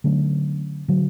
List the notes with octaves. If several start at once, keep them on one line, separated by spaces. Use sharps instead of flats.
D3 F#3 A3 C#4
D3 F#3